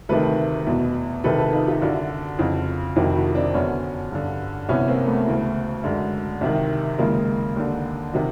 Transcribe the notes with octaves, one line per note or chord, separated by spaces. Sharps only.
D2 C3 D#3 A4 B4
E2 B2
C2 C3 D#3 A4 B4
A4 B4
D#4 F4
F4 G4
F#2 D3 E4 F#4
F2 C#3 E3
F2 C3 D#3 E4 F#4
E4 F#4
C4 D4
F#2 D3 B3 C#4
G2 D3
C2 C3 E3 B3 C#4
A#3 C4
A3 B3
D2 C#3 E3
F#2 D3 G#3
C2 C3 D#3
D#2 C#3 E3 G#3 A#3
D#2 D3
C3 D#3